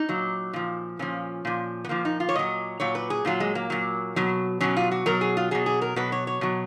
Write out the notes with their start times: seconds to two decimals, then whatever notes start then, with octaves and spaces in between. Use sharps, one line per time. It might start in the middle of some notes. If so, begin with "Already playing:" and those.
Already playing: D#4
0.09 A#2 F#3
0.53 A#2 F3
0.99 A#2 F3 C#4
1.45 A#2 F3
1.84 B3
1.89 A#2 F3 A#3
2.05 D#4
2.20 F4
2.29 C#5
2.35 A#2 F#3 D#5
2.80 A#2 F#3 C#5
2.95 B4
3.10 G#4
3.25 A#2 F#3 F4
3.40 G#3
3.55 A#3
3.70 A#2 F#3
4.16 B2 F#3
4.60 B2 F#3 C#4
4.77 F4
4.91 F#4
5.06 B2 F#3 A#4
5.21 G#4
5.37 F4
5.51 B2 F#3 G#4
5.66 G#4
5.82 A#4
5.96 B2 F#3 B4
6.12 C#5
6.27 C#5
6.41 B2 F#3